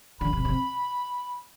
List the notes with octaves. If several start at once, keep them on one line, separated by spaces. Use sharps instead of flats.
D3 B5
C3
C3